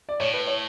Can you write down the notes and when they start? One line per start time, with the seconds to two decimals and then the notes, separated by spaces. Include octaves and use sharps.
0.09 D5
0.20 A2 C#5
0.34 B4
0.47 C#5